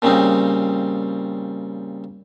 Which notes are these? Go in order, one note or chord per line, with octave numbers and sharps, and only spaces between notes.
A#2 C#3 G3 C4 D#4